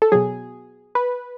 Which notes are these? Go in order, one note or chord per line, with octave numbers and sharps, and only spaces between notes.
A4
B2 F#3 G#4
B4